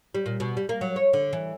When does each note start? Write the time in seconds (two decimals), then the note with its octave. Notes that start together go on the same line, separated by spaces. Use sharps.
0.14 G3
0.26 A#2
0.40 B2
0.57 G3
0.69 A#3
0.81 F#3
0.96 C#5
1.13 D3
1.33 E3